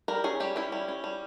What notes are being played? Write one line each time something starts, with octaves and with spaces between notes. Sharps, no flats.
G3 A#4
C#4 G#4
G3 G4
C#4 E4
G3
C#4
G3